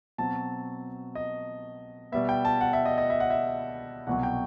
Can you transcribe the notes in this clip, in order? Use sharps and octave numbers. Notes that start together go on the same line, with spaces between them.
B2 F#3 C4 A5
D#5
B2 G3 B3 E5
G5
A5
F#5
E5
D#5
D#5
E5
F#5
E5
C2 B2 F#3 F#5
G5